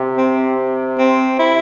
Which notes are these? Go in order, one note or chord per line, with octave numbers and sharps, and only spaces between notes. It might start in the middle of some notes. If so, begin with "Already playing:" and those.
Already playing: C3
C4
C4
E4